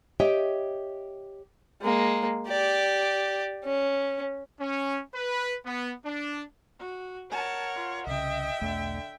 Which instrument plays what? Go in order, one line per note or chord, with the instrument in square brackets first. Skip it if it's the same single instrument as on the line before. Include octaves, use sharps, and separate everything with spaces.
[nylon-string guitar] G4 C#5 D#5 E5 G5
[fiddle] G#3 A#3
G4 D5
C#4
[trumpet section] C#4
B4
B3
D4
[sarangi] F#4
[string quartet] A#4 C#5 F#5 [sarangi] A5
[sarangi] F4
[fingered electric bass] C2 C#3 [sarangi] D#5 [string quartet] E5 G5
[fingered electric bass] B1 E2 A3 [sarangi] D3